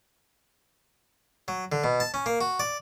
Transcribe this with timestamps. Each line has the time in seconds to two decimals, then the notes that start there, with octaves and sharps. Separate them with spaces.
1.48 F#3
1.72 D3
1.84 B2
2.00 A5
2.14 C#4
2.26 A#3
2.41 F#4
2.60 D5